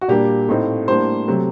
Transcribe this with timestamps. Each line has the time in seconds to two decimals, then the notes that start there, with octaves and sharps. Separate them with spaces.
0.01 F#4
0.08 A#2 G3 A#3 D4 G4
0.49 A2 A3 C4 D#4
0.88 A2 G3 A#3 D4 C5
1.28 C3 F#3 A3 C4